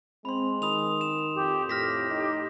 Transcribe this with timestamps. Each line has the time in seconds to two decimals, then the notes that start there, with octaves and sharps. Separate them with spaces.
0.25 G#3 C4 B5 C6
0.62 D#3 B5 D#6 F7
1.01 E7
1.35 F2 G4
1.69 A2 G4 F6 A#6 B6
2.10 D#4